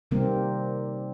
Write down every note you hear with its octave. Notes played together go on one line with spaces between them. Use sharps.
C3 D#3 G3 A#3 C4 A#4